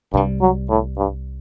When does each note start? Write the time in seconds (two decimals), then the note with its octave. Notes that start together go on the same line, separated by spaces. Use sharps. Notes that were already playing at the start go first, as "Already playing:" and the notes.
0.13 C2 G2 C3 G3
0.41 F#3
0.70 A2
0.98 G2